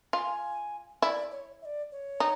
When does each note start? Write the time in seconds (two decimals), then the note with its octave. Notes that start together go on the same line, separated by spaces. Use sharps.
0.13 F4 G#5
1.02 E4 D5
1.31 C#5
1.61 E5
1.65 D5
1.92 C#5
2.20 D#4